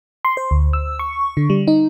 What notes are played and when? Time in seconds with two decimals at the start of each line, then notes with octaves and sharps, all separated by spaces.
0.25 C6
0.37 C5
0.51 D2
0.73 E6
0.99 C#6
1.37 D3
1.50 G3
1.68 D#4